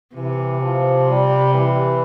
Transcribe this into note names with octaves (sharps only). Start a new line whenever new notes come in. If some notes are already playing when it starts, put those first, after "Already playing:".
C3 E3
F3
G3
E3